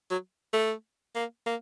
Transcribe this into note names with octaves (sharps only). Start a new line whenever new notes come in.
F#3
A3
A#3
A#3